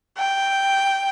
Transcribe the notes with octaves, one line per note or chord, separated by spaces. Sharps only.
G5